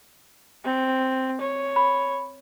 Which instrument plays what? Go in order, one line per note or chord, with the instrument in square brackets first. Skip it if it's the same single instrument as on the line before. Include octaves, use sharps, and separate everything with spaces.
[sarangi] C4
C#5
[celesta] B5